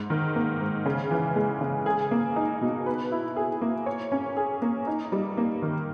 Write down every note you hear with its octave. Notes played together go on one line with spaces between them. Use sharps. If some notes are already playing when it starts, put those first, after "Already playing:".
Already playing: G#2
D#3
A#3
G#2
C#3
E3
G#3
C#3
G#4
A#3
D#4
B2
B4
E4
G#4
A#3
C#5
C#4
G#4
A#3
D#4
G3
A#3
D#3